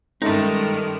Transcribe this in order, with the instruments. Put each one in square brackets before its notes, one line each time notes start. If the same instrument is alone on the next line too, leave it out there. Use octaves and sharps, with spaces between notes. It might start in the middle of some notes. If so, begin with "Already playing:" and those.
[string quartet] G2 D#3 [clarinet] G#3 [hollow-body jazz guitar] A3 D#4 [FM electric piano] C#4 A4 E5